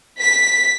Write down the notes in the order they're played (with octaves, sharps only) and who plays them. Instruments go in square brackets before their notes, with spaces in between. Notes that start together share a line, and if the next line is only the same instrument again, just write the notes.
[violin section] B6